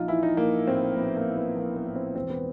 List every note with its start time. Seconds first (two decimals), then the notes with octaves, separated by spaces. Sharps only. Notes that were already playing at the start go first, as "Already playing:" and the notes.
Already playing: A#1 D#4 F4
0.08 E3 E4
0.23 D#4
0.37 A#1 A#3
0.67 A2 C4
0.97 A#1 B3
1.17 A#3
1.26 E3
1.37 B3
1.56 A#1 A#3
1.76 B3
1.86 A2
1.95 C4
2.15 E1 C4
2.30 B3